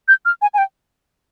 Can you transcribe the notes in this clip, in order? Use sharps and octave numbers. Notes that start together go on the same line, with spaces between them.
G6
F6
G#5
G#5
G5